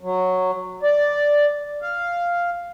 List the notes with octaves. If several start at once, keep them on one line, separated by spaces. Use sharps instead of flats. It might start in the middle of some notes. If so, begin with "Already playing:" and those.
F#3
D5
F5